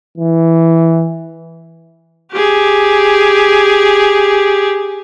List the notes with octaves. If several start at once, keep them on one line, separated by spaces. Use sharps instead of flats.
E3
G4 G#4